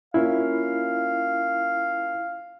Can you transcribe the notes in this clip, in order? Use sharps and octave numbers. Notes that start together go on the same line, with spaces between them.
A#3 C#4 E4 F4 F5